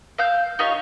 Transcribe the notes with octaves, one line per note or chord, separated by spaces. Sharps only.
F5 E6 G6
D#4 F4 G4 C#5